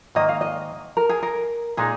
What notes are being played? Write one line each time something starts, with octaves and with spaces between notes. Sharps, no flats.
G#2 D#3 A#3 D#5
F5
D#5
A#4
G#4
A#4
A#2 G#3 D#4 G#4